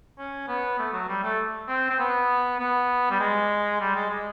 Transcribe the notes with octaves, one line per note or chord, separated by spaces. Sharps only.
C#4
B3
A3
F#3
G3
A3
C4
C4
B3
B3
G3
G#3
G3
G#3
G#3